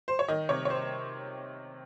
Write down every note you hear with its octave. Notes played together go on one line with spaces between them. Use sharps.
C5
C#5
D#3 D#5
C3 C#5
C#5
C5